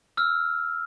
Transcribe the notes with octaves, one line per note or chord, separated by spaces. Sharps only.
E6 F6